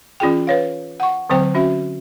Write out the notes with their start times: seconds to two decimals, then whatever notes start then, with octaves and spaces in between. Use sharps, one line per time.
0.20 E3 C#4 F4 G#4 G5
0.47 B4 C#5 F5
1.00 F#5 C#6
1.29 D3 F#3 C4 C5 G5
1.55 C#4 F#4 E5